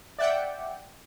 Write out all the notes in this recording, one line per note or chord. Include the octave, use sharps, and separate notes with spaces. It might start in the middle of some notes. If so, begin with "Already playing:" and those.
D5 E5 F#5 G5